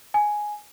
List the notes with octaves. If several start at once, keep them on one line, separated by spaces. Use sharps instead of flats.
G#5